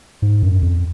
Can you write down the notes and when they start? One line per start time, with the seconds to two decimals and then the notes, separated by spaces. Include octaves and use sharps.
0.22 G#2
0.43 F#2
0.63 F2